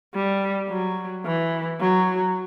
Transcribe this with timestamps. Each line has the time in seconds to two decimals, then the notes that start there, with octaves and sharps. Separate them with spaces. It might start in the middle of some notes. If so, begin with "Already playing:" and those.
0.15 G3
0.69 F#3
1.26 E3
1.81 F#3